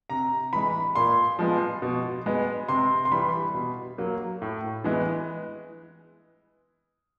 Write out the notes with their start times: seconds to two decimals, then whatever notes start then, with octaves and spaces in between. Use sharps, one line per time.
0.10 C3 A#5
0.53 E3 G#3 B5
0.95 A#2 C6
1.39 F3 G#3 B3
1.82 B2
2.26 G#3 B3
2.68 C3 C6
3.05 C6
3.12 E3 G3 B5
3.54 B2
3.98 F#3 A#3
4.42 A2
4.84 E3 G#3 B3